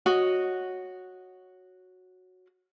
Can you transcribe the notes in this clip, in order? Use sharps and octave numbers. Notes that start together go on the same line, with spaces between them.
F#4 C#5 D#5